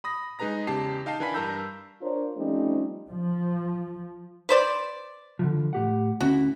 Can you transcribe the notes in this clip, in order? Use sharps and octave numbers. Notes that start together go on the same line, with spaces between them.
B5 D#6 A#6
G#3 D#4 G#4 B4 A#5 A#6
E2 C#3 G4 A5 C7
D#4 F5 G5 A5 C7
E3 D4 A#4 G#5 B5 B6
G2 A#4 A5 A#5 E6 G6
D4 F4 A#4 C5 C#5
F3 G3 A3 C4 C#4 D#4
F3
B4 C5 D5
D3 E3 F3
A2 G4 F#5
D2 C#4 E4 F#4